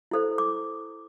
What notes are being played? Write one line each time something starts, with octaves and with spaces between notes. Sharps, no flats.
E4 A4 C5
D6